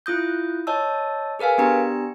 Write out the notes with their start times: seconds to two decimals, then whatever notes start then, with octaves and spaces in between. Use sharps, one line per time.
0.06 E4 F4 D#6 G6
0.67 C#5 D#5 A5 E6
1.39 G#4 A#4 B4 F5 G#5
1.58 B3 D4 G4 A#5 C#7